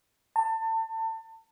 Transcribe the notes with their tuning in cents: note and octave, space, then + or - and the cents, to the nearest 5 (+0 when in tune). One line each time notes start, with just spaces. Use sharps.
A5 +30